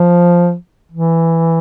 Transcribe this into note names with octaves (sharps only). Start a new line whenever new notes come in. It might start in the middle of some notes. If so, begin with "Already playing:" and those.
Already playing: F3
E3